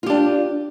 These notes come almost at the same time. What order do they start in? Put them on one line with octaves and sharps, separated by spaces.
F4 G4 D4